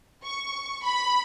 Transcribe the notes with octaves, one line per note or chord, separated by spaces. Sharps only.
C#6
B5